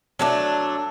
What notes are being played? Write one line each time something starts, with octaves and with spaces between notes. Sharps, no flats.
F#3 A3 D4